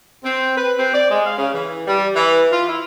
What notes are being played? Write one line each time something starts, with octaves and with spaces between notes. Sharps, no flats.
C4
B4
C4
D5
G#3
F5
C#3
E3
G3
E3
F4
E4